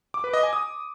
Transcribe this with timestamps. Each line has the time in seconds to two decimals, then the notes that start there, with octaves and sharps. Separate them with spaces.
0.14 D6
0.24 B4
0.33 D#5
0.43 G#5
0.53 D#6